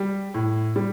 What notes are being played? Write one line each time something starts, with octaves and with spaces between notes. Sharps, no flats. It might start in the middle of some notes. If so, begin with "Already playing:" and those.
Already playing: G3
A2
G3